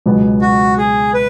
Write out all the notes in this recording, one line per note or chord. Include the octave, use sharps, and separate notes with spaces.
C#2 B2 F#3 B3
F#4
G#4
B4